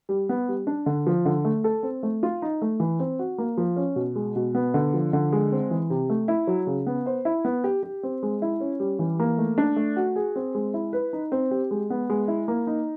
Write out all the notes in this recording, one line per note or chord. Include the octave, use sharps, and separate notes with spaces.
G3
B3
G3
D4
D3
F3
D3
A3
A4
C4
A3
F4
D#4
A3
E3
C4
F#4
A#3
F3
C#4
B2
G#3
B2
B3
D3
F3
D3
G#3
C4
E3
C3
A3
E4
F#3
C#3
B3
C5
E4
B3
G4
G4
C4
G#3
E4
C#4
G3
E3
A#3
A3
D4
A3
F#4
G#4
C4
G#3
E4
B4
D#4
C4
G4
G#3
B3
G#3
E4
A#3
D#4